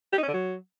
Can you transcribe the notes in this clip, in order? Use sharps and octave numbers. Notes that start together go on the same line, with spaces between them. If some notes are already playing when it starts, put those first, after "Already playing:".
G4
D#4
C#4
D3
F#3